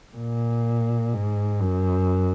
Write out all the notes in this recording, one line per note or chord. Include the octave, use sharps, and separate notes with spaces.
A#2
G#2
F#2